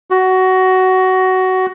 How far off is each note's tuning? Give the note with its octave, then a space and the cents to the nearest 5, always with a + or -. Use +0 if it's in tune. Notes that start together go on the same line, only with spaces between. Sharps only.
F#4 +15